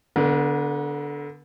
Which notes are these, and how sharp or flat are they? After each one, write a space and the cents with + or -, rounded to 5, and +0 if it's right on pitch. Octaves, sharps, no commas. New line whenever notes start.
D3 -15 B3 +0 A#4 +45